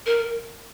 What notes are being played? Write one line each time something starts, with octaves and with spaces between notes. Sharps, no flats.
A#4